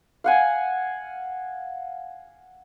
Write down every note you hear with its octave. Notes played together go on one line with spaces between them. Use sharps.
F5 F#5 G#5